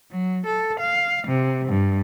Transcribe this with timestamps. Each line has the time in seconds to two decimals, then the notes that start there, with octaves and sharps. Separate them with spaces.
0.11 F#3
0.46 A4
0.80 F5
1.27 C3
1.68 G2